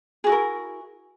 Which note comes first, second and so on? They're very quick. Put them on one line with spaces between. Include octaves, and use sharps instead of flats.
G#4 F#4 E4 A#4